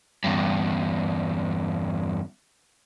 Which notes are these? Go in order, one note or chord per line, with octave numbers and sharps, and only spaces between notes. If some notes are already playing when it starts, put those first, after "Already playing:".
E2 G2